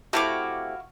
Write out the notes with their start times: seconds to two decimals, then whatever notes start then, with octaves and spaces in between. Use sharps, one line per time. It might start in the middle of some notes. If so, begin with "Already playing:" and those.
0.13 C3 A3 E4 F#4 F5 D6